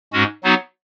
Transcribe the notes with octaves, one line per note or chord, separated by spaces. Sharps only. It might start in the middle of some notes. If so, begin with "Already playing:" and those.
G#2 G#3 C#4 F#4
F#3 B3 D#4 F#4